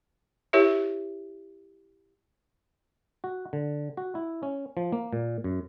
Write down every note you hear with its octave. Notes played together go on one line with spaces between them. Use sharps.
E4 G4 A#4 C#5 E5
F#4
D3
F#4
E4
C#4
F3
A#3
A#2
F#2